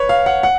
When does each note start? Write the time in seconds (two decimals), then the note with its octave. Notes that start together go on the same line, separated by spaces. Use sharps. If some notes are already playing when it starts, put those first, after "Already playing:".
Already playing: B4 C#5
0.09 F5
0.26 F#5
0.43 F#5